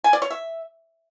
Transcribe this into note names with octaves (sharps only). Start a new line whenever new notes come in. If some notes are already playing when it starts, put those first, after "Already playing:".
G#5
D5
C#5
E5